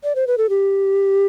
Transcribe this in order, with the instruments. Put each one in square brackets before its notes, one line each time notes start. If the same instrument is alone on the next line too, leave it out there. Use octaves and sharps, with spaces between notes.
[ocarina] D5
C5
B4
A4
G4